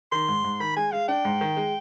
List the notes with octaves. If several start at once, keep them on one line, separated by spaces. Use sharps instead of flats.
D#3 C6
G#2
G#2
D#3 B5
G#3 G#5
G#3 F5
D4 G5
G#2
D#3
G#3